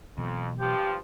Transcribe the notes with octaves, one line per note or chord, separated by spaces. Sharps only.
F2 B2 E3 F#3
G2 F3 G4